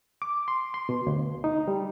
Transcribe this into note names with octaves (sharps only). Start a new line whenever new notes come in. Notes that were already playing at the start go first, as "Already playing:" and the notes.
D6
C6
C6
B2
D2
D#4
G3